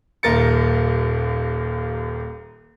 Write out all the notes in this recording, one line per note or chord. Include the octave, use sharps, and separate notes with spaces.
D#1 D#2 A#4 A6 C#7